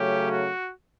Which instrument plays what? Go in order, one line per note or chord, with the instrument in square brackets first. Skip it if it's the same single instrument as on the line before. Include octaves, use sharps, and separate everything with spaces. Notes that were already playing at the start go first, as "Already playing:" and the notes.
Already playing: [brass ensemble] C#3 F#3 A3 C#4 G4
F#4